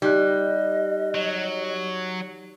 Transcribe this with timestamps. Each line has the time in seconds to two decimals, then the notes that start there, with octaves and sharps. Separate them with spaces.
0.02 G3 D#4 G4 D#5 F#6
1.15 F#3